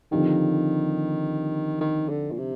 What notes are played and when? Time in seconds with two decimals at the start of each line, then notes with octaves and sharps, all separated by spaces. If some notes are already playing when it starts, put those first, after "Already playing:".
0.11 D3 D#3 F3 C4 D#4 G4
1.81 D#3
2.09 D3
2.31 A#2
2.38 C3